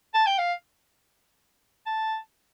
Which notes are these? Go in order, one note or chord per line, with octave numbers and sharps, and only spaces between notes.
A5
G5
F5
A5